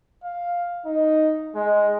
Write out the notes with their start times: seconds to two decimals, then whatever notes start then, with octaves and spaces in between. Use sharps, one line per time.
0.24 F5
0.85 D#4
1.55 G#3